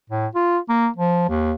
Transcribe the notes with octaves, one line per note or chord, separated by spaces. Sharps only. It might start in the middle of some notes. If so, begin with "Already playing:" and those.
A2
F4
A#3
F3
D#2